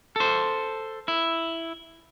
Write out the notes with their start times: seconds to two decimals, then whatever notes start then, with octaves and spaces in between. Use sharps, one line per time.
0.16 A4 C5
1.08 E4